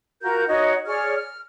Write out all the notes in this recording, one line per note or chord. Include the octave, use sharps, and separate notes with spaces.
F4 F#4 A#4 G6
D#4 F#4 C#5 D#5
G#4 C#5 D5 F6
F6